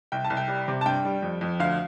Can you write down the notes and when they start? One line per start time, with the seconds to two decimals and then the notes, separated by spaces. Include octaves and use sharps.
0.12 C2 G5
0.24 A5
0.30 C2
0.37 G5
0.48 G3
0.68 C3
0.81 A5
0.86 G2 G5
1.05 G3
1.22 F2
1.41 F2
1.59 D2 F5